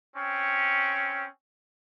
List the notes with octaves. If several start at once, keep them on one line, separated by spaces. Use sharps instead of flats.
C4 C#4